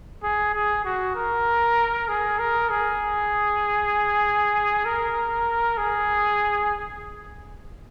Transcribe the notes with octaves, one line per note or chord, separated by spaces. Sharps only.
G#4
G#4
F#4
A#4
G#4
A#4
G#4
A#4
G#4